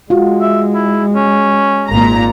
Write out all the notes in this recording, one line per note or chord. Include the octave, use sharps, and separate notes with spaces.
G#3 F4 F#4
E5
E4
C#4
G#1 A#2 A#5